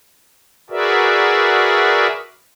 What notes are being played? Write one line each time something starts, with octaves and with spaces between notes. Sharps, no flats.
F#4 G#4 A#4 B4 D5 E5